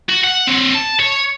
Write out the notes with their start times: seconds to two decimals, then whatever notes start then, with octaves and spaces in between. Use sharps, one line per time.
0.09 F#4
0.24 F#5
0.48 C4 C#5
0.75 A5
1.00 C#5